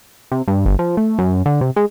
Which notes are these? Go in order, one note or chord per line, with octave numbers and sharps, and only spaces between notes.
C3
G2
G1
F3
A3
F#2
D3
C3
G#3